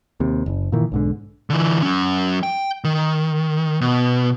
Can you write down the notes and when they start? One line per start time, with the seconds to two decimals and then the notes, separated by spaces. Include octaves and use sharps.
0.20 D#2 C3
0.46 F#1
0.72 A#2 D#3 E3
0.92 B1 G#2 D3
1.50 D3 E3
1.82 F#3 C#4
2.43 G5
2.84 D#3
3.81 B2